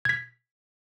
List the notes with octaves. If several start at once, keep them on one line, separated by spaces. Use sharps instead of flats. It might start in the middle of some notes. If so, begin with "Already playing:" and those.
G#6 B6